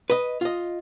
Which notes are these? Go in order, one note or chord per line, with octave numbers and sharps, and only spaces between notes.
B4 D#5
F4 D#5